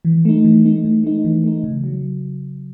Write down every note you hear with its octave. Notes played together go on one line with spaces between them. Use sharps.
E3
A3 D#4
E3
A3 D#4
E3
A3 D#4
E3
A3 D#4
C#3
F#3